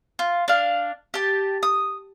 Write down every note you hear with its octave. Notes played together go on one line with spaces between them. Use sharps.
F4
D4 F5
G4 A5
D#6